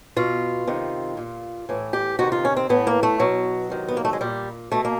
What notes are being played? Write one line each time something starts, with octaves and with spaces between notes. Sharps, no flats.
B2 F4
C3 D#3
A#2
A2 E3
G4
C3 D#3 F#4
F4
C#4
C4
A2 E3 B3
A#3
A3
B2 F#3
C3 D#3
B3
A#3
A3
G#3
A#2 G3
B2 A3
A#3